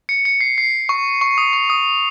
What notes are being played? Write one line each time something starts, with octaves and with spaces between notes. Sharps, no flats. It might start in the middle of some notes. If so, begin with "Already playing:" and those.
C#7
C#7
C7
C7
C#6
C#6
D#6
C#6
D#6